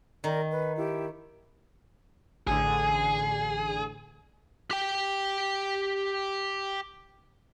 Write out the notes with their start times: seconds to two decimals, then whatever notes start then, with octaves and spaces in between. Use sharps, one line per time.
0.24 D#3 A#4 D5
0.50 B4
0.77 E4 G4
2.47 A1 D3 G#4
4.71 G4 G5